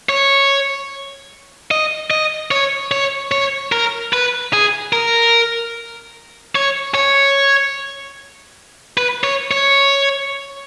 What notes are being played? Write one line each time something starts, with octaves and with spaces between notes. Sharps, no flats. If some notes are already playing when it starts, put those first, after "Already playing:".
C#5
D#5
D#5
C#5
C#5
C#5
A#4
B4
G#4
A#4
C#5
C#5
B4
C#5
C#5